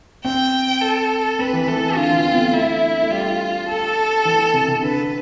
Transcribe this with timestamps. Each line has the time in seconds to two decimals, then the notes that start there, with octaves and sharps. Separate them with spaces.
0.24 C4 G5
0.82 A4
1.39 C4 B4
1.53 E3
1.67 E3 A4
1.96 D3 F4
2.10 E3
2.25 C4
2.32 B3
2.39 A3
2.53 A3 E4
3.02 A3
3.11 G3 F4
3.68 A4
4.25 E3
4.53 C3
4.68 C3
4.82 D3 B4